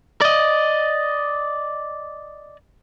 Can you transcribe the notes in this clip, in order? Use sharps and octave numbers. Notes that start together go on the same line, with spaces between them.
D5 D#5